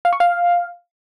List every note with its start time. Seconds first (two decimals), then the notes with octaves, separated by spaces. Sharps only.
0.05 F5
0.13 C#6
0.20 F5